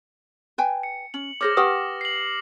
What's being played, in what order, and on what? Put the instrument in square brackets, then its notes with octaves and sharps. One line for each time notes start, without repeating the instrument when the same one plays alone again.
[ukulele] B4 G5 G#5
[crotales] C#7
[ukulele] C#4 [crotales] F#7
[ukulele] G#4 C5 C#5 [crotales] D6 F6 A#6
[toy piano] G4 B4 D#6 [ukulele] F#5 G5
[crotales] C7 F#7